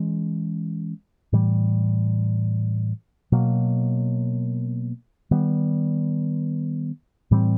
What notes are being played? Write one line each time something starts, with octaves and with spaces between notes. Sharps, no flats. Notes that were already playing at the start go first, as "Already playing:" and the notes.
Already playing: E3 G#3 C#4
A2 E3 G3
B2 F#3 A#3
D#3 G3 B3
A2 E3 G3 C4